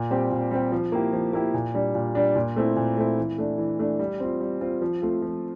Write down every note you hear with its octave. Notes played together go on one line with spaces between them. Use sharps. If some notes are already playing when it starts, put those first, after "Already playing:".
Already playing: A#2
G3 C4 G4
A#2
G3 C4 G4
F3
A#3 E4 G4
F3
A#3 E4 G4
A#2
G3 D4
A#2
G3 D4
A#2
A3 C4 E4
A#2
A3 C4 E4
E3
A3 D4
E3
A3 D4
G3
C4 F4
G3
C4 F4
F3
A3 C4 F4
F3